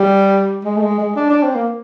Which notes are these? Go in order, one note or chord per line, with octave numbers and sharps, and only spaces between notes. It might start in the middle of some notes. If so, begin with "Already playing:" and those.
Already playing: G3
G#3
A3
G#3
G#3
D4
D4
C4
A#3